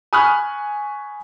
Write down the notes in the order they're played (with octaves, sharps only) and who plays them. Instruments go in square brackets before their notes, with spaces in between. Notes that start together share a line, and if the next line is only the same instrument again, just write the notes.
[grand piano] G#5 B5 C#6 D#6 F6 F#6